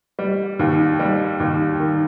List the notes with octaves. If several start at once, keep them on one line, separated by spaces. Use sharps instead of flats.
G3
D#2
G3
D#2
D#3